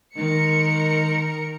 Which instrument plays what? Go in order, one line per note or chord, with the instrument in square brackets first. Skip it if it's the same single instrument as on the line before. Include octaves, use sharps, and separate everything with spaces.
[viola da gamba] D#3 [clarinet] G#3 [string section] A#4 C#7